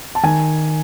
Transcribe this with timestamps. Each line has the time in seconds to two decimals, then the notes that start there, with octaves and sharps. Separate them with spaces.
0.15 A5
0.23 D#3 G#5